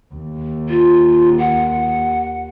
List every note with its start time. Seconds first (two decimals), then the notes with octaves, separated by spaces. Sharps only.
0.14 D#2
0.69 F4
1.39 F#5